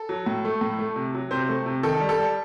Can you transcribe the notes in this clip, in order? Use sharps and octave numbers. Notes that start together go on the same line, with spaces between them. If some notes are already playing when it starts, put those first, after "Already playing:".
Already playing: A4
F#3
A2
A3
A2
A3
C3
F#3
C3 C5
A3
C3
D#3 A4
G3
A4
G3